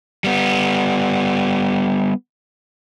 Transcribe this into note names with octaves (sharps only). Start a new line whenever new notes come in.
G3 B3